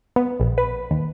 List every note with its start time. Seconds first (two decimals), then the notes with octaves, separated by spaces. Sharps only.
0.16 B3
0.40 A#1
0.58 B4
0.91 D#2